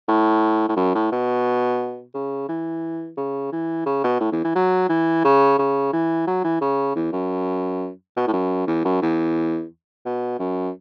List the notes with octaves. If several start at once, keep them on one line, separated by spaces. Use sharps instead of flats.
A2
A2
F#2
A2
B2
C#3
E3
C#3
E3
C#3
B2
A2
E2
E3
F#3
E3
C#3
C#3
E3
F#3
E3
C#3
E2
F#2
B2
A2
F#2
E2
F#2
E2
B2
F#2